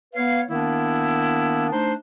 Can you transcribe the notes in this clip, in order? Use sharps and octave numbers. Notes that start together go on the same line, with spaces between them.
B3 B4 C#5 F5
D#3 A#3 B3 D4 E4
A3 D4 D#4 C5